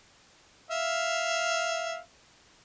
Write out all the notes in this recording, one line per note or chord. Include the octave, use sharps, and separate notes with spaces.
E5 F5